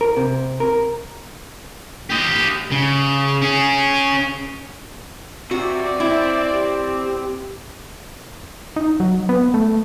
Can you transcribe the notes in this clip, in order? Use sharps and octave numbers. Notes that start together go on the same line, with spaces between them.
A#4
C3
A#4
G4 D#5
C#3
C#4 G#4
C3 F#4 D5
C4 E4 E5
G4
D#4
F#3
B3
A3